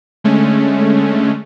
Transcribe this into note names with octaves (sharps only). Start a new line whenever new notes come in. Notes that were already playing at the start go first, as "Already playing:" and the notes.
D3 G#3 A3 C#4